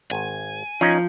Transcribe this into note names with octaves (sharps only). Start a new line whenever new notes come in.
G#1 G#5
F3 C#4 D#4